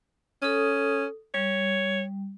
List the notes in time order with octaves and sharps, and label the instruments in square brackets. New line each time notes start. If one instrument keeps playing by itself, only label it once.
[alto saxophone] C#4 [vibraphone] A4 D#6
[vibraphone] G3 [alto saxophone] C#5